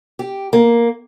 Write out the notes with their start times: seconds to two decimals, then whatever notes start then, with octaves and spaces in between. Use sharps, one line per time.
0.19 G4
0.53 A#3